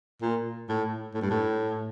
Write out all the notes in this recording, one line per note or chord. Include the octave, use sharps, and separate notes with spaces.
A#2
A2
A2
G2
A2